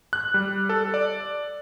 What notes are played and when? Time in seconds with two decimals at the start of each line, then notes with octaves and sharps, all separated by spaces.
0.13 F#6
0.34 G3
0.69 A4
0.94 D5